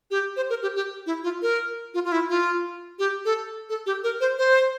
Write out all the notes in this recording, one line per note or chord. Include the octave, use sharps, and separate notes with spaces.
G4
C5
A#4
G4
G4
E4
F4
A#4
F4
F4
E4
F4
G4
A4
A4
G4
A#4
C5
C5